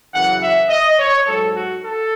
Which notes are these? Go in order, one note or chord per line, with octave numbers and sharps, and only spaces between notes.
F#2 C#3 E3 F#5
E5
D#5
C#5
G#2 F#3 A4
F#4
A4